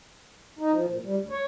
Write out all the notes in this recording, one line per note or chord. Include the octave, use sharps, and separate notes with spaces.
D#4
F3
A#2
G3
D2
C#5